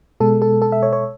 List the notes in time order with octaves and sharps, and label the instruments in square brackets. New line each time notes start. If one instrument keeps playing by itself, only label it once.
[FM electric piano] B2 G#3 A4
A4
A4
E5
C#5
C#5